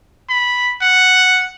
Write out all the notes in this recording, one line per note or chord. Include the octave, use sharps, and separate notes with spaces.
B5
F#5